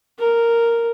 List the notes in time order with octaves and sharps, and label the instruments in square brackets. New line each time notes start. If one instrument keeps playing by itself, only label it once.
[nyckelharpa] A#4